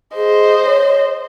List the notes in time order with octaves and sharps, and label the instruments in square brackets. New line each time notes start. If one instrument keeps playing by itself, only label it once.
[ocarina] G#4 [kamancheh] C5 D#5
[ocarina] C#5